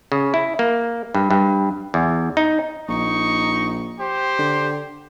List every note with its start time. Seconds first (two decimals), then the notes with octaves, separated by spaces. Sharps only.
0.12 C#3
0.34 E4
0.59 A#3
1.15 G2
1.31 G2
1.94 E2
2.37 D#4
2.88 A#1 D#4 C#6
3.99 G4 C5
4.39 D3